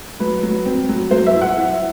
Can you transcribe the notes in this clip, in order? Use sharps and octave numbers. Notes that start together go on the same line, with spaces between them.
F#3 B4
F#3
C4
F#3
F#3 C5
E5
E4
F#5
E4